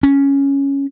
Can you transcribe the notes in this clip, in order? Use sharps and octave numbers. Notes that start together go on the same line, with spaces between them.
C#4